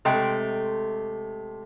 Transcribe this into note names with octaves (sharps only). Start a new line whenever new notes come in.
C3 G#3 A3 G5